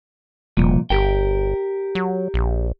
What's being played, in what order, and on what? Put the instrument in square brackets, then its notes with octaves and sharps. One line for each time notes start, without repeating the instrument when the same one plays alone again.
[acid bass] E1 [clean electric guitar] C2 F2 A#2
[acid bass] G1 [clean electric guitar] G4 A#4 G5
[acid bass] F#3
A#1